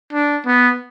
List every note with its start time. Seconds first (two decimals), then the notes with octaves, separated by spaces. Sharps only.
0.13 D4
0.46 B3